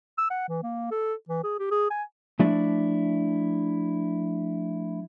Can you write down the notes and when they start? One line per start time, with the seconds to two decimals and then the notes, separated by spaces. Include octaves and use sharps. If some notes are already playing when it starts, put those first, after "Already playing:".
0.18 E6
0.30 F#5
0.49 E3
0.63 A#3
0.91 A4
1.29 E3
1.44 G#4
1.59 G4
1.71 G#4
1.90 G#5
2.39 F3 A3 D4 E4 D5